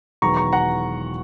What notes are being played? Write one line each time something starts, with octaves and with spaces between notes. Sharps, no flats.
E1 E2 D#3 F#3 A#5 C#6
A#5 C#6
F#5 A#5